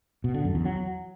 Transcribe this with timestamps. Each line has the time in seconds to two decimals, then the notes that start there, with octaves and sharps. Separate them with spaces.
0.24 B2
0.34 D3
0.45 F#2
0.55 E2
0.65 F#3